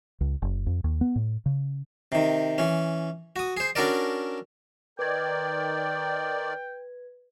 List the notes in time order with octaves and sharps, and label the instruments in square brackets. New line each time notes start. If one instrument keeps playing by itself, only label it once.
[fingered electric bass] C#2
F#1
F2
D#2
B3
A2
C#3
[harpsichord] C3 D#3
E3 C#4
F#4 D#6
G#4 C5
C#4 D4 F#4 A4 A#4 D5
[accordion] D#3 D5 [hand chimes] B4 G#6 [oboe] G5